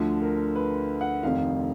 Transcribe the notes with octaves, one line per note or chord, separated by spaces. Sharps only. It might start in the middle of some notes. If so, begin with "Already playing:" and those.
Already playing: D2 D3 F3
A#4
B4
F#5
F1 F2 D#3 F5